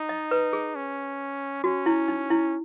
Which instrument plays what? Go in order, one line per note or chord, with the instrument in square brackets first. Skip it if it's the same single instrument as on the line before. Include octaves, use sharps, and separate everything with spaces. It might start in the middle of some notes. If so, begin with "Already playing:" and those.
Already playing: [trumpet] D#4
[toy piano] D#5
B4
G#4
[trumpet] C#4
[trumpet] C#4 [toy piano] F#4
[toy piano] E4
D#4
E4